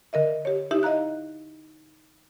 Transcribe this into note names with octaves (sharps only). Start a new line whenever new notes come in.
D3 A#4 D#5 E5
G4 C#5
D#4 E4 G4 E5
D#5 F5 A#5 F#6